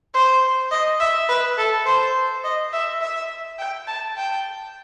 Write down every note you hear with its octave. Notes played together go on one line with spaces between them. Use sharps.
C5
D#5
E5
B4
A4
C5
D#5
E5
E5
G5
A5
G5